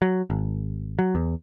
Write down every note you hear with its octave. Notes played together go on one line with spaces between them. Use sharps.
F#3
G#1
F#3
E2